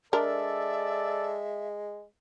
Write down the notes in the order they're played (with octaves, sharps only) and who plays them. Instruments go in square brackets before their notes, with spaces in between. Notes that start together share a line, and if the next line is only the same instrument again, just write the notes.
[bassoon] G#3 [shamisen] D4 A#4 [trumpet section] A4 D5 [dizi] E5